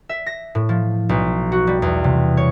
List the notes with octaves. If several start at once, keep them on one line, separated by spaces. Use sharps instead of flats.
E5
A#6
A2
F3
B1
F#4
G3
E2
C3
C#5